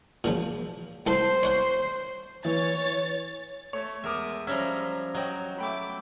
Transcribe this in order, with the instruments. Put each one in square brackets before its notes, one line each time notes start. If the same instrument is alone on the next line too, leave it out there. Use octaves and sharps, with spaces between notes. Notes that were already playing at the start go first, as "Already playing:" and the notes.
[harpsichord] A#2 C#3 F3
[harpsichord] C2 A4 C6 [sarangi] C5
[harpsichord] C#5 F#5 C6
[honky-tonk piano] E3 [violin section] C#5 A6
[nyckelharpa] A3 [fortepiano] C#5
[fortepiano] E2 A#4 D6 [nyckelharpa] G#3 D#6 [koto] E5
[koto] F3 G3 C#4 [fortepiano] E5 [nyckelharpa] A#5
[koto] F#3 [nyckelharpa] F#4 [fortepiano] D#5 G5
[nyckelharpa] A3 D6 [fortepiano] E5 G5 B5